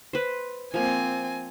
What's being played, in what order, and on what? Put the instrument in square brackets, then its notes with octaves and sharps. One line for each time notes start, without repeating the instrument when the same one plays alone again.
[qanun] B4 C5
[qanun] F3 A#3 [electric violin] C4 G#5